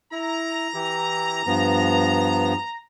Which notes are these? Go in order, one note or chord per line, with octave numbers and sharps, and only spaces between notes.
E4 A#5
E3 E4 G4
G2 F3 B3